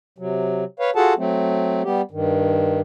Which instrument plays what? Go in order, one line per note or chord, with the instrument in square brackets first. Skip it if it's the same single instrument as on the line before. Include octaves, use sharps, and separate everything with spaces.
[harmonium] C3 F#3
B4 C#5 F5
F4 F#4 G#4 A4 F#5 A5
F#3 A3 C4
G3 B3 G4
G2 D#3